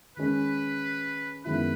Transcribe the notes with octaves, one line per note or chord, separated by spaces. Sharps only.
D#3 G#3 C#4 B4
F#2 D#3 G#3 B3 E4 B4